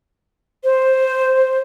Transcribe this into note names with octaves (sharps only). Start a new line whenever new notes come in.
C5